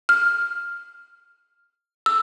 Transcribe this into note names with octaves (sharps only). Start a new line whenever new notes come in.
F6
E6